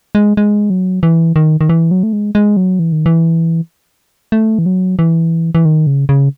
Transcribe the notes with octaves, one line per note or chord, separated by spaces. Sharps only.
G#3
G#3
F#3
E3
D#3
D#3
E3
F#3
A3
G#3
G#3
F#3
E3
D#3
E3
A3
E3
F#3
E3
E3
D#3
C#3
C#3